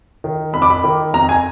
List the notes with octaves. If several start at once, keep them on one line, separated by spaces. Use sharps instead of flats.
D#3
F2 B5
D6
B5
D#3
F2 A#5
G#5